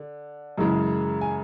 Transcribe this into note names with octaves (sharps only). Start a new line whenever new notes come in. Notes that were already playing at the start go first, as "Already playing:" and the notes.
Already playing: D3
F#2 C#3 E3 G#3
G#5